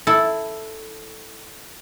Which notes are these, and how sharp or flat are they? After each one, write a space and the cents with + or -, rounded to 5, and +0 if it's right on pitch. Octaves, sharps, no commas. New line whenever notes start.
E4 +0 A4 +0